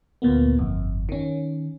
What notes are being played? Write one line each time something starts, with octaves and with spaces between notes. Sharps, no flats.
D2 A#2 A#3 B3
G1 F2
D#3 C#4